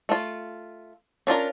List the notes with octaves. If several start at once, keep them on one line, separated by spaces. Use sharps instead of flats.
A3 F4
C#4 D4 F4 A#4